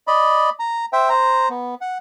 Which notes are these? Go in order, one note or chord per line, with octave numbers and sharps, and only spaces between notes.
D5 D#5 B5
A#5
C5 E5 G5
C5 A#5
B3
F#5